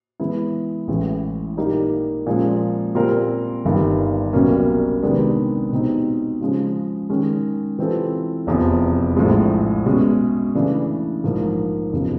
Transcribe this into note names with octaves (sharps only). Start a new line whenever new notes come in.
E3 G#3 B3 E4
A1 A2 E3 G#3
A#2 G3 A#3 D#4 G4
A#2 F3 G#3 C#4
A#2 G3 C4 F4 A#4
G1 G2 D#3
C2 B2 F#3 A#3 C#4
C3 D#3 G#3 B3 D4
B2 G3 C4 D#4
C#3 F3 G#3 C#4
D#3 G#3 C#4
E3 G3 C4 F4 A4
F1 E2 C3 F3
A#1 A2 F3 G#3
B2 G#3 C#4
C#3 E3 A3 D4
A#1 G#2 F3 A#3
F1 E2 C#3 F3